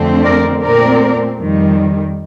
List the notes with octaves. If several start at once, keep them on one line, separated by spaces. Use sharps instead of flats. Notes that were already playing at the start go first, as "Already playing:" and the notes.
Already playing: F2 D3 A3 C4
A#4 D5
A#2 A3 C4 A#4 D5
F2 D#3 G3